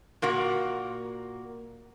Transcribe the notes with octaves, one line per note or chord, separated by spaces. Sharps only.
A#2 A#3 F#4